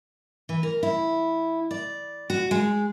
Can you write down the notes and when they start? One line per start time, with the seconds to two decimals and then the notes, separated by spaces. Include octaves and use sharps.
0.49 E3
0.63 A#4
0.83 E4
1.71 D5
2.30 F#4
2.51 G#3